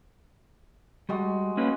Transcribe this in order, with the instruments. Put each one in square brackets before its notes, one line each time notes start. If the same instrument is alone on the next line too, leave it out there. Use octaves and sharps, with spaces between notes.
[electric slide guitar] G3 [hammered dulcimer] G#3 F#4
[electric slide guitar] A#3 C#4 B4